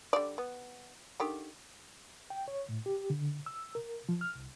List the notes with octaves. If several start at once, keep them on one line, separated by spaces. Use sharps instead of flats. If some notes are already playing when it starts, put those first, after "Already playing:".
D3 G3 D5
B3
D3 D#3 G4
G5
C#5
A2
G4
D3
E6
A#4
F3
F6
C2